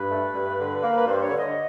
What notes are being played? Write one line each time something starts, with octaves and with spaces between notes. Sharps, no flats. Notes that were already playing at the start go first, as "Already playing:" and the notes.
Already playing: G2 B4
A3
G2
D3
A#3
B4
G2 C5
C#5
D3
D#5